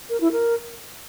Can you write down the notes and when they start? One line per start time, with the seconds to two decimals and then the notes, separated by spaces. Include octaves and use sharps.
0.10 A#4
0.21 E4
0.32 A#4